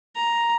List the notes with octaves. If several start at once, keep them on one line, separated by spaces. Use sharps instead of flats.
A#5